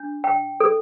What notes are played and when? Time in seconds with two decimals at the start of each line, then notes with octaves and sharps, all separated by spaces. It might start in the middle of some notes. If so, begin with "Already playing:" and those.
Already playing: D4
0.24 G5
0.60 A4